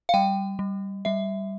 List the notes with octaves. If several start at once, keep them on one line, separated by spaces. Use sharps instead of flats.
F5
G3 G5
G3
G3 E5